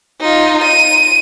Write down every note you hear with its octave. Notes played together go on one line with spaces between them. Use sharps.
D#4 F4
D#7